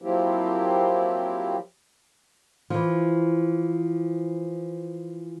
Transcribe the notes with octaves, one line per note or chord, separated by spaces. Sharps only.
F3 F#3 A#3 C4 E4 G4
E3 F3